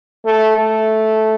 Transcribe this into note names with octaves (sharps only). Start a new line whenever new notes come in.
A3
A3